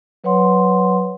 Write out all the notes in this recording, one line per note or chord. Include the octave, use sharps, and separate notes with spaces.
F#3 B4 C#5 F#5 C6